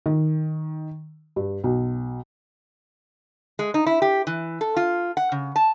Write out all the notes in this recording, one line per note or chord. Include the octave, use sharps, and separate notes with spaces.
D#3
G2
B1
G#3
D#4
E4
G4
E3
A4
F4
F#5
C#3
A5